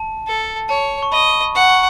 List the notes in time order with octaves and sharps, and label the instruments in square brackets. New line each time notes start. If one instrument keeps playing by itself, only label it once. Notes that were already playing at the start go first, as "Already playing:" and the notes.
Already playing: [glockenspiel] A5
[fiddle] A4
[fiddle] C#5 [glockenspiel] A5
[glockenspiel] C#6
[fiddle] D#5 [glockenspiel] B5
[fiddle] F#5 [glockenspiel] C#6
[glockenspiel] C#6